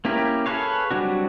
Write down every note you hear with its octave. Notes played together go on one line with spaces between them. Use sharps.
A#3 C#4 E4 G4 A#4
G#4 A4 B4 C#5 F5
F#3 G3 C4 D4 F#4